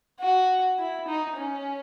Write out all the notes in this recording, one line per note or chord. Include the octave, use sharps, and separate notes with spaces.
F#4
E4
D#4
C#4